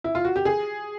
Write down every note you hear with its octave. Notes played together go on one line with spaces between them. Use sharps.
E4
F4
F#4
G4
G#4